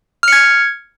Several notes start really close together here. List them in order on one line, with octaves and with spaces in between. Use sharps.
F6 C#7 G#6